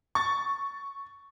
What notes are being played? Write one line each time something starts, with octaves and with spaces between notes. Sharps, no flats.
C#6 A6